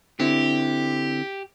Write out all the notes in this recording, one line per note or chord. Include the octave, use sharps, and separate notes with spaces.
D3 C4 E4 G4